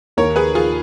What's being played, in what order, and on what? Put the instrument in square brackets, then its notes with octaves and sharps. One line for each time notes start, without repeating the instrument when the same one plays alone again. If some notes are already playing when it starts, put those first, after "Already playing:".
[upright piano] D#2 D#3 A#3 [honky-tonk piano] A#4 C#5
[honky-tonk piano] G#4 B4
F4 G#4